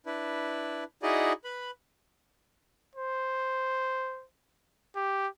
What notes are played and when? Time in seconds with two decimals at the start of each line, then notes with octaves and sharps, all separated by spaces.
0.06 D4 E4 B4
1.03 D#4 E4 F#4 G#4 D5 D#5
1.44 B4 B5
2.96 C5
4.96 G4